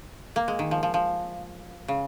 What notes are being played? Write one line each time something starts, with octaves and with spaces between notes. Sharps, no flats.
A#3
G#3
D#3
F3
F3
F3
C#3